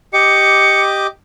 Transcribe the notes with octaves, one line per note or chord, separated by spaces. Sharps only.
G4 D#5 D6 C#7